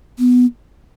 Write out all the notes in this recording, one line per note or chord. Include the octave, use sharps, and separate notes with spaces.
B3